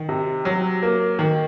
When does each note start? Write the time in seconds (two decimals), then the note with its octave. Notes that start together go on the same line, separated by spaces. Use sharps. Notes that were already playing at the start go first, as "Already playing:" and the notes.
Already playing: D#3
0.09 C3
0.45 F#3
0.83 A#3
1.19 D#3